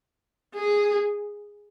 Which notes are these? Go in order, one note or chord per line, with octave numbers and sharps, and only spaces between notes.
G#4